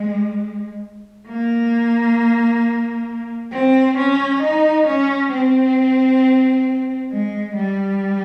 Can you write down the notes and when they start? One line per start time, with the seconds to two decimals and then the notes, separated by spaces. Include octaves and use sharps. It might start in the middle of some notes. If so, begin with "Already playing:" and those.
Already playing: G#3
1.28 A#3
3.52 C4
3.97 C#4
4.42 D#4
4.86 C#4
5.31 C4
7.11 G#3
7.56 G3